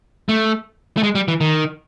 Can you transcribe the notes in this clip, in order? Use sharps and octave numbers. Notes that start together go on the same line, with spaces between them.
A3
A3
G#3
G3
E3
D#3